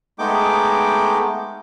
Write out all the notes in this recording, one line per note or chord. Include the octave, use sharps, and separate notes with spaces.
G#3 A3 B3 D#4 G5 D6